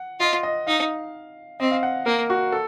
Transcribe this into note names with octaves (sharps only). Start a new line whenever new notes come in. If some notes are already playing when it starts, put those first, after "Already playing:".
Already playing: F#5
F4 D#5
D#5
D#4 F5
C4 D#5
F5
F#5
A#3 A#4
F#4
A4